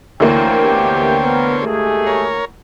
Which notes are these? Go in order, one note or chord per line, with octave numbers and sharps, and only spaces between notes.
D2 D3 E3 A#3 C5 C#5 G5
B3 E4 G4
B3 A#4
G#3 A3 G4 G#4
A#4 C#5